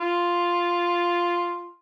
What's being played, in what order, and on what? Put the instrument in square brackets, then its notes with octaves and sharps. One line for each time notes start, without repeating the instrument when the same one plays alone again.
[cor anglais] F4